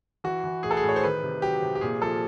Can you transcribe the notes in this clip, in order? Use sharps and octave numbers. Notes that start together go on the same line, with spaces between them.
E3 F#4
E3
A2 G#4
A4
G#4
A2
C#5
C5
D#3 B4
C3
F#3 G4
C3
G4
A#2 G#4
F3 A4